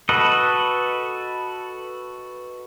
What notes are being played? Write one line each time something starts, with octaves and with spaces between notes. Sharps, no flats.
F#4 A4 B4 D#5